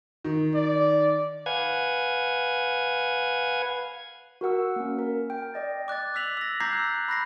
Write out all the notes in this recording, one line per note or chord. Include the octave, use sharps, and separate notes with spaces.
D#3
D5
B4 F5 F#5 G#5 G#6
F#4 A#4 F#5 E6
A#3 C#4
A#4
G5
D5 D#5 A6
D6 F#6 G#6 A6
D6 E6 B6 F7 F#7
E6 A#6
A#5 D6 G6 G#6 A#6 C7
E6 F#6
B5 F#6 A#6 C7